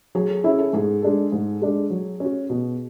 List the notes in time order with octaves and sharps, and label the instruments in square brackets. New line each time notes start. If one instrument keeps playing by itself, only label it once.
[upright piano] F#3 [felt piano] G#4
[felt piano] A4
[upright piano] C#4 E4 [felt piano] G#4
[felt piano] A4
[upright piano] G#2 [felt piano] G#4
[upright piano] G#3 D4 A4
G#2
G#3 D4 A4
F#3
C#4 F#4
B2